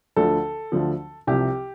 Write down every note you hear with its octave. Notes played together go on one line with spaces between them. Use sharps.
D2 D3 F3 A4
D2 D3 F3
C2 C3 F3 G4